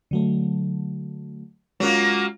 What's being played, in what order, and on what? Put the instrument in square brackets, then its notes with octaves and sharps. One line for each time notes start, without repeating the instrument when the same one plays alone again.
[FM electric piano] D3 F#3 A3
[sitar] F#3 A#3 [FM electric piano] G#3 C#4 F4